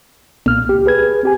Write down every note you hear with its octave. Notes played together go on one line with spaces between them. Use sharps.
B1 A#2 A#3 F6
C#2 G4
G#4 B4 G#6
C4 G4 G#5